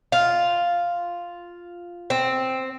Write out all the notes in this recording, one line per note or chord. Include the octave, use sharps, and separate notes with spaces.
F4
C4